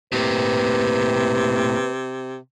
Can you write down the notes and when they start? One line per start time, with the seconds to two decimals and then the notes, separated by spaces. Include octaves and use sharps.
0.12 A2 C3 A#3 B4